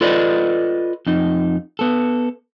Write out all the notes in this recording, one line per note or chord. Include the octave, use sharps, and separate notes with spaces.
F4 A4 B4 D5 D#5
F2 D#4
B3 A4